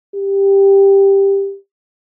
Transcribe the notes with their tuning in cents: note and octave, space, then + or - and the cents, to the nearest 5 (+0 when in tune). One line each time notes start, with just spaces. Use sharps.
G4 +5